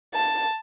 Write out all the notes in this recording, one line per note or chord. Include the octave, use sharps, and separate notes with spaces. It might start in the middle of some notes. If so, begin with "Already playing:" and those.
A5